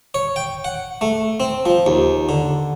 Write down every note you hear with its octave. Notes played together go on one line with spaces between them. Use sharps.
C#5
G5
F#5
A3
C4
F3
D#2
D3